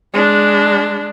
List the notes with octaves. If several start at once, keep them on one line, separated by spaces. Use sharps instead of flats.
G#3 D4